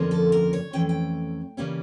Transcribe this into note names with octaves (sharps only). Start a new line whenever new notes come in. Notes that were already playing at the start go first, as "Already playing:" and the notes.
Already playing: F2 D3 F3 A#3 C#4
A4
A#4
C#5
F2 E3 A3 C#4 G5
G5
C#3 E3 G3 A#3 C#4